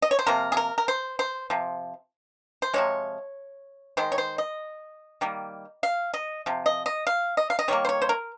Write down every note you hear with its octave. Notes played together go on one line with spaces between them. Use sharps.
D#5
C#5
C5
C3 F3 A#3 A#4
G#4
A#4
A#4
C5
C5
C3 F3
C5
C3 F3 G#3 C#5
D#3 G#3 C5
C#5
C5
D#5
D#3 G3 A#3
F5
D#5
C3 F3
D#5
D#5
F5
D#5
F5
D#5
D#3 G3 A#3 C#5
C5
C#5
C5
A#4